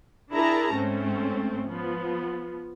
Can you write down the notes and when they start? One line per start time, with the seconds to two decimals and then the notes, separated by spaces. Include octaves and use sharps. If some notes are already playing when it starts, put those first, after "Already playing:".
0.31 D4 E4 G#4 A#4 A5 A#5
0.72 G#2 A3 C4 C#4
1.67 F3 B3